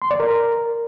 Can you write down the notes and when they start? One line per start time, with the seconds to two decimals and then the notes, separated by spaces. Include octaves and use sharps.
0.02 C6
0.11 D5
0.20 A#4